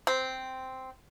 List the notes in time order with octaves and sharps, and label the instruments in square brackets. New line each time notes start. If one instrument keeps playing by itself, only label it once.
[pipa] C4